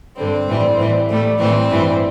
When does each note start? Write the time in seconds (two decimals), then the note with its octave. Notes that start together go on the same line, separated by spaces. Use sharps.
0.17 G2 D3 G3 C4
0.47 A2 E3 G3
0.78 A2 E3 G3
1.08 A2 G3 A3
1.39 A2 E3 G3 C4
1.70 G2 E3 G3